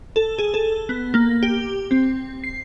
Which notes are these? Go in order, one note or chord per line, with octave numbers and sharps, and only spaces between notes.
A4
G#4
A4
B3
A#3
G4
C4
C7